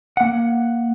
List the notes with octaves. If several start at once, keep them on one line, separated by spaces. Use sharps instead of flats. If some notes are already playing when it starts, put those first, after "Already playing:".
A#3 F#5